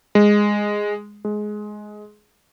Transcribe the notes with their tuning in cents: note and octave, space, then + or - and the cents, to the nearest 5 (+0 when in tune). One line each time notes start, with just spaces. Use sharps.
G#3 -5
G#3 +15